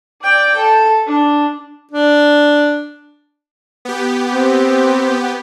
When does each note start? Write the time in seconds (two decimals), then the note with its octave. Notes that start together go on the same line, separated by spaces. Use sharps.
0.22 D5 G5
0.56 A4
1.07 D4
1.92 D4
3.85 B3 G4
4.34 C4